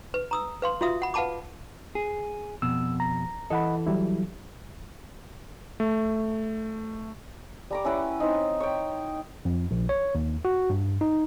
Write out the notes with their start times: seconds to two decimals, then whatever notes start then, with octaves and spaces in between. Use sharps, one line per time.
0.14 B4
0.31 A#5 D#6 E6
0.62 B4 F5 C6
0.81 F4 F#4 E5 F5 D#6
1.02 F#5 B5
1.14 B4 F5 F#5 A5 B5 D6
1.95 G#4
2.62 F2 B2 E6
3.00 A#5
3.50 E3 A4 D#5 F#5 B5
3.87 F#3 G3 E4
5.80 A3
7.70 G3 A#5 D6
7.85 C#4 E4 B4 F#5
8.20 C4 D#4
8.60 C#5 G5
9.45 F2
9.71 A#1
9.89 C#5
10.15 D#2
10.45 F#4
10.70 G2
11.01 D#4